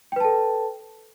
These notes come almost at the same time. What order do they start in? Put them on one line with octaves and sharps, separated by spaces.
G5 B4 A5 A4